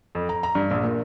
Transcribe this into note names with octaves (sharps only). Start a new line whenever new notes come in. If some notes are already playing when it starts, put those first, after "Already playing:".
F2
A#5
A#5
G2
A#1
A#2